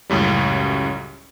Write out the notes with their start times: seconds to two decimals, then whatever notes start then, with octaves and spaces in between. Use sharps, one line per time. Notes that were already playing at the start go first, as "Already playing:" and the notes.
0.10 C#2 F#2 A2 G3